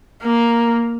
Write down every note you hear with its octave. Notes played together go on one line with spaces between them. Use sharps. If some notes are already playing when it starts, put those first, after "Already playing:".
A#3